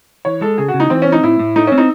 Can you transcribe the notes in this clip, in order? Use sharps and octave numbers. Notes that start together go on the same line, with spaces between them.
E3 C#5
G#3 A4
C#3 G#4
F#4
C#3
D#4
E3 C4
C#4
C4
D#4
A2 E4
A2
A3 D#4
C4 C#4
D#4